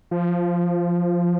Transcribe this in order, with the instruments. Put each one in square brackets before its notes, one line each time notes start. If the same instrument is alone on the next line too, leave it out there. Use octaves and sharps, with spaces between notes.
[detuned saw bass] F3